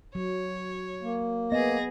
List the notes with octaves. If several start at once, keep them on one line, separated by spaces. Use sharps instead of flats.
F#3 C#5
A#3
B3 G#4 D#5 A#6